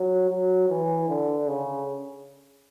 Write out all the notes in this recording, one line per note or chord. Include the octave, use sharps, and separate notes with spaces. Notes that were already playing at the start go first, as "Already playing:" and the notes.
Already playing: F#3
F#3
E3
D3
C#3